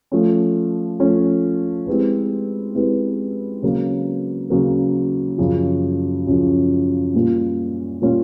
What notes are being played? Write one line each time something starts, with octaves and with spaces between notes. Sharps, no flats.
F3 A3 C#4
F3 A3 C#4
G#3 C4 E4 G4 B4
G#3 C4 E4 G4 B4
C#3 F#3 A#3
C#3 F#3 A#3
F#2 C#3 F3
F#2 C#3 F3
A#2 G3 A#3 C#4 F4
A#2 G3 A#3 C#4 F4